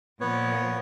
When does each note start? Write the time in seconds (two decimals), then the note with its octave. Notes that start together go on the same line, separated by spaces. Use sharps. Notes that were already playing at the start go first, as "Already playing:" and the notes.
0.21 A#2 F3 B3 B4 C#5